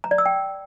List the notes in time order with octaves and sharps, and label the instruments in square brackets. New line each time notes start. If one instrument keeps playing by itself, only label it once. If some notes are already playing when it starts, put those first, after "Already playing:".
[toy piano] A#5
D5
E6
G5